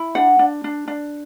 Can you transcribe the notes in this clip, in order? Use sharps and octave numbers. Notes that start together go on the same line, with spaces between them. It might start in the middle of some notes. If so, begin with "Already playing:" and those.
Already playing: E4
D4 F#5
D4
D4
D4